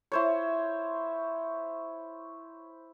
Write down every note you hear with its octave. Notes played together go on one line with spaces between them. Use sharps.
E4 C5 C#5